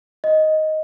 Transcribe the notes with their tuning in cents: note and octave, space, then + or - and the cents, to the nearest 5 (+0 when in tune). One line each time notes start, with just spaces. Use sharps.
D#5 +5